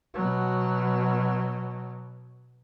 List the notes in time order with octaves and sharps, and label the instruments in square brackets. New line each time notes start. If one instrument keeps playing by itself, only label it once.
[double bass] B2 F#3